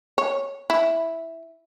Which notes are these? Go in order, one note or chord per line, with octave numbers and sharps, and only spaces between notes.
C#5
E4